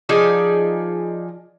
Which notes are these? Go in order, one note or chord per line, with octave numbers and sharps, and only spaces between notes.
F3 D#4 G#4 D5